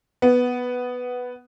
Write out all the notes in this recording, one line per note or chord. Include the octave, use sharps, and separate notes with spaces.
B3